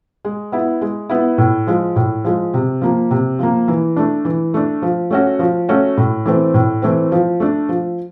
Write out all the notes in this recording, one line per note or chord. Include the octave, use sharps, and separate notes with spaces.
G#3
B3 E4
G#3
B3 E4
A2
F3 G#3
A2
F3 G#3
C3
F3 A#3
C3
F3 A#3
E3
A3 D4
E3
A3 D4
F3
A3 C#4 F#4
F3
A3 C#4 F#4
A2
E3 A3 C4
A2
E3 A3 C4
F3
A3 D4
F3